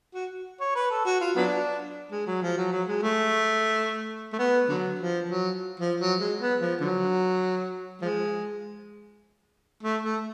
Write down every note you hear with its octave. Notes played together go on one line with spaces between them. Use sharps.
F#4
C#5
B4
A4
F#4
F4
F#3 B3 D4
G#3
F#3
F3
F#3
F#3
G#3
A3
A3
B3
D3 F#3
F3
F#3
F3
F#3
G#3
B3
F3
D3 F#3
F3 G#3
A3
A3